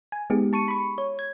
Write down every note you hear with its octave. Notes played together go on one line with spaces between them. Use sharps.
G#5
G#3 B3 D#4 G4 G#4
A5 C#6 C#7 D#7
B5 C#6
C#5
G#6